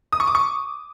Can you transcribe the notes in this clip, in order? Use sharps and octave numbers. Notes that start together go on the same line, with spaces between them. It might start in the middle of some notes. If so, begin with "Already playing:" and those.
D#6
C#6
D6
C#6